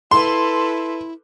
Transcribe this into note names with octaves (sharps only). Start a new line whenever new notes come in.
E4 A4 B4 C6